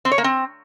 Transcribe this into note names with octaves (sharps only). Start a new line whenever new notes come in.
C4
C#5
A#3
C4